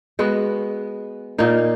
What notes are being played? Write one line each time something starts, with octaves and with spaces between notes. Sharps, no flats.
G#3 B3 F#4
A#2 A#3 D#4